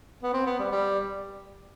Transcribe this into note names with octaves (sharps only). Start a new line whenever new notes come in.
B3
C4
B3
G3
G3